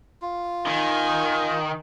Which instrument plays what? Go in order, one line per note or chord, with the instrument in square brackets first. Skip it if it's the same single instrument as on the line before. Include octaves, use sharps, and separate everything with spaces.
[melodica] F4
[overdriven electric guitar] D#3 [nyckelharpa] D#4 G#5